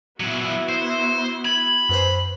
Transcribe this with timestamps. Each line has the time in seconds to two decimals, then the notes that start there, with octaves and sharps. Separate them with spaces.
0.20 A#2 F#3 B3 E4 F#4
0.69 C5
1.45 B5 G#6
1.89 F#2 B4 C5